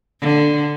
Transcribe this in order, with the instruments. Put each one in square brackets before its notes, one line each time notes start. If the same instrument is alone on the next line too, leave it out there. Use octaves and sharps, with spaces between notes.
[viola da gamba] D3